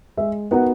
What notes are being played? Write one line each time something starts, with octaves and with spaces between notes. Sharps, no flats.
G#3 E5
B3 D#4 F#4 A#4 F#5